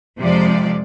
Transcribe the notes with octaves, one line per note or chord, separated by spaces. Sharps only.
F2 C3 F3 G#3 D5